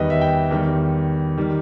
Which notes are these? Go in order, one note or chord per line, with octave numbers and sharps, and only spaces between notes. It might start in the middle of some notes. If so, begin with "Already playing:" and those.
Already playing: E2 D#3 G3 B4 D#5
E5
G5
E2 D#3 G3
D#3 G3